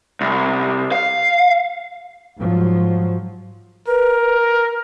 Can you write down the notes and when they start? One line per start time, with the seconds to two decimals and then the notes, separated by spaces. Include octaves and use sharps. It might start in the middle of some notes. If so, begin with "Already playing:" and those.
0.21 C2
0.92 F5
2.40 G#2 F3 F#3
3.87 A#4 B4